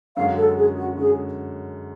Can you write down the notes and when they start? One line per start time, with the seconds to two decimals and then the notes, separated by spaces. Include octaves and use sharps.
0.16 F#2 D3 G#3 C#4 F#4 F5
0.37 A4
0.57 G#4
0.77 F#4
0.97 D3 G#3 C#4 F#4 G#4